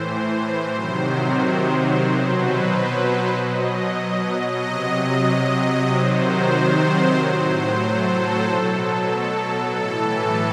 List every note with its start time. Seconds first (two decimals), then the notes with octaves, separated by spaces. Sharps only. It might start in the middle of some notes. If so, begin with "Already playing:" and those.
Already playing: A2 E3 C5
0.71 C3 D#3 F#3
2.01 B2 F#3
2.33 B4
2.65 B4
2.98 B4
3.29 B2 F#3 D#5
4.59 C3 F#3 D#5
5.88 C3 D#3 F#3 C5
7.17 A2 F#3 C5
7.82 A4
8.47 B2 F#3
9.76 A2 E3 A4